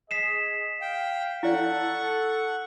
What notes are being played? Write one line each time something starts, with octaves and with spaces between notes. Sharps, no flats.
G#4 D#5 B6 C7 E7
F5 G5
E4 A4 D5 F#5 C#6